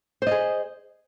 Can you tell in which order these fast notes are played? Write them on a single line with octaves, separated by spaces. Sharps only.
C5 D#5 G#4